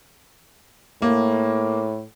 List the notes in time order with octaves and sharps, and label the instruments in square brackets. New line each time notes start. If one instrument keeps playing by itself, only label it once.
[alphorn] A2 [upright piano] A#3